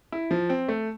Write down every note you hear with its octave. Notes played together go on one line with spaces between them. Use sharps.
E4
F3
C4
A3